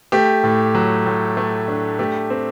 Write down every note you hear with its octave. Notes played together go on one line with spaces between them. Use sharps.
A3 G4
A2
F#3
A2
A3
D4
A3 G4
C4